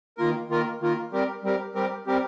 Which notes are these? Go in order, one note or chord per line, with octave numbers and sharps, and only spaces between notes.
D#3 A#3 F4 A#4
D#3 A#3 F4 A#4
D#3 A#3 F4 A#4
G3 C4 G4 A#4
G3 C4 G4 A#4
G3 C4 G4 A#4
G3 C4 G4 A#4